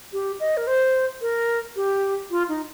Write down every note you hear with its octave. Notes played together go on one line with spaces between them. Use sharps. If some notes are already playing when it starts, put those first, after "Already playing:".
G4
D#5
A#4
C5
A#4
G4
F4
D#4